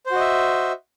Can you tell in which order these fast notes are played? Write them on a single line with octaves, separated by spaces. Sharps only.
C5 F#4 D#5 E5